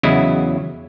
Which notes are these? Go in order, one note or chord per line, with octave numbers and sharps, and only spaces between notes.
E2 C#3 F#3 E4 D#5